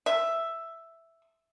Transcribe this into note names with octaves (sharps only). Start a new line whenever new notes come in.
E5